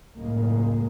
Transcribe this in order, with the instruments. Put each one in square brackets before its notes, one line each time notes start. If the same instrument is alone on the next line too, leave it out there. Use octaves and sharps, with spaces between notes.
[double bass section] C#2 F#2 A2 G#3 A#3